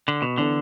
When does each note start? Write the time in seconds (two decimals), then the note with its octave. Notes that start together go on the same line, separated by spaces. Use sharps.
0.08 D3
0.22 B2
0.38 D3 E3 B3 D4 A4